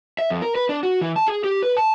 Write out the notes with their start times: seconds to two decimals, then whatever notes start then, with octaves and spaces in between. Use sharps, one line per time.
0.19 E5
0.30 F2
0.42 A#4
0.55 B4
0.69 D4
0.83 F#4
1.01 E3
1.16 A5
1.28 G#4
1.44 G4
1.62 B4
1.77 A5